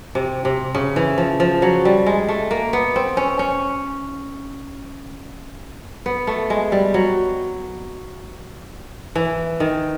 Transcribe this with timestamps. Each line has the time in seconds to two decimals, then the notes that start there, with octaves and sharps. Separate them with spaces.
0.15 C3
0.45 C3
0.75 C#3
0.96 E3
1.18 F3
1.40 F3
1.62 F#3
1.85 G3
2.06 G#3
2.28 A3
2.51 A#3
2.73 B3
2.96 C4
3.17 C#4
3.39 C#4
6.06 B3
6.27 A3
6.50 G#3
6.72 G3
6.94 F#3
9.15 E3
9.60 D#3